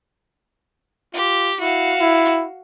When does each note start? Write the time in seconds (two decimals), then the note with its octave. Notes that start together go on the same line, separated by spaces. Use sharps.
1.14 F4 G4
1.60 E4 F#4 F5
2.00 E4